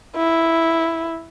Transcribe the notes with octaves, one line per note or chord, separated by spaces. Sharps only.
E4